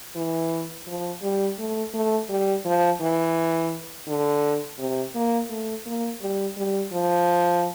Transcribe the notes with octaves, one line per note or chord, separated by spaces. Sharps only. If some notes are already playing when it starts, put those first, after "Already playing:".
E3
F3
G3
A3
A3
G3
F3
E3
D3
C3
A#3
A3
A#3
G3
G3
F3